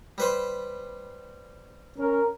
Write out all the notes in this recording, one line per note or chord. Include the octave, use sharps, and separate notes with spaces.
G3 B4 C5
C#4 A#4